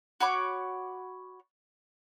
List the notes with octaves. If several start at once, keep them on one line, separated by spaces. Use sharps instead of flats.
F#4 C#5 B5 D6